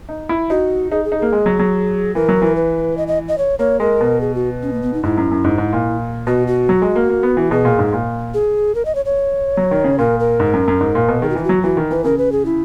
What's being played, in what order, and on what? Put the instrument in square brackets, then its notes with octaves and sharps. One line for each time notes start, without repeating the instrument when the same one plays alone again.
[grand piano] D#4
E4
[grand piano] D#4 [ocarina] F#4
[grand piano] D#4 [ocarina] G#4
[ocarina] G#4
[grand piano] D#4
[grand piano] A#3 [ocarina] G#4
[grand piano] G#3
F#3
F#3
[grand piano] E3 [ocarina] A#4
[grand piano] F#3
E3
[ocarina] B4
D#5
D#5
D#5
C#5
[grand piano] A#3 [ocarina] C#5
[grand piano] G#3 [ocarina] A#4
[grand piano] B2
[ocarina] G#4
F#4
C#4
A#3
B3
D#4
[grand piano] G#2 [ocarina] E4
[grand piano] F#2
F#2
G#2
G#2
A#2
[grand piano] B2 [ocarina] F#4
[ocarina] F#4
[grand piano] F#3
G#3
A#3
A#3
B3
E3
[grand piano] B2 [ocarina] G#4
[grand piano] A#2
G#2
A#2
[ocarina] G#4
A#4
D#5
C#5
C#5
[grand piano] F#3
D#3
C#3
[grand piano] A#2 [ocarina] A#4
[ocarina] A#4
[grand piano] G#2
F#2
F#2
G#2
A#2
B2
[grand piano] D#3 [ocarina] G#4
[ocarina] F#4
[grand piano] E3 [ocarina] E4
[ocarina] F#4
[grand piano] F#3
[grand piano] E3 [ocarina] F#4
[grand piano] D#3
[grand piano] E3 [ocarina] B4
[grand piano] C#3 [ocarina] A#4
[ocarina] B4
G#4
E4